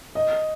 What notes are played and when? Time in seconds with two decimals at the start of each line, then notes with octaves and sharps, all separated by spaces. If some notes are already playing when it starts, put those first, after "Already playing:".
0.15 D#5